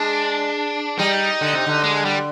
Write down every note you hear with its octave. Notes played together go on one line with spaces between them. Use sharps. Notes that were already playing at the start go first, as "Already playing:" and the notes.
Already playing: G#3 D4
G3 D#4
D3
C3
D3
G#3
G3